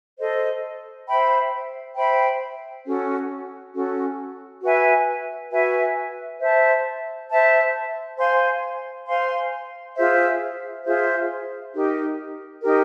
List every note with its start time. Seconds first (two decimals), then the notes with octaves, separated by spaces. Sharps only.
0.19 A4 C5 D#5
1.07 C5 E5 G5 B5
1.96 C5 E5 G5 B5
2.85 C#4 F#4 A4
3.74 C#4 F#4 A4
4.63 F#4 B4 E5 G#5
5.51 F#4 B4 E5 G#5
6.41 C5 E5 A5
7.29 C5 E5 A5
8.18 C5 F5 G#5 C6
9.07 C5 F5 G#5 C6
9.96 F4 G#4 C5 E5
10.84 F4 G#4 C5 E5
11.73 D#4 G4 A#4
12.62 D#4 G4 A#4